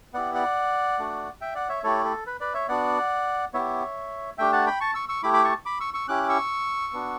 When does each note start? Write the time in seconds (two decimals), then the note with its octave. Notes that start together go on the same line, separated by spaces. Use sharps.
0.14 B3 E4 G4 D5 F#5
0.35 D5 F#5
0.99 A3 D4 F#4
1.41 E5 G5
1.55 D5 F#5
1.69 C#5 E5
1.83 A3 E4 G4 A4 C#5
2.05 A4
2.27 B4
2.40 B4 D5
2.54 C#5 E5
2.68 B3 D4 F#4 D5 F#5
3.54 B3 E4 G4 C#5 E5
4.38 A3 D4 G4 E5 G5
4.52 F#5 A5
4.66 G5 B5
4.81 A5 C#6
4.94 C#6 E6
5.09 C#6 E6
5.23 A3 E4 G4 B5 D6
5.34 B5 D6
5.44 A5 C#6
5.65 B5 D6
5.80 C#6 E6
5.94 C#6 E6
6.08 C#4 E4 G4 D6 F#6
6.23 D6
6.29 C#6 E6
6.93 B3 D4 F#4